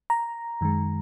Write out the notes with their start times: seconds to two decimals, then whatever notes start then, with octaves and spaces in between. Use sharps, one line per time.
0.10 A#5
0.61 F#2 D#3 G#3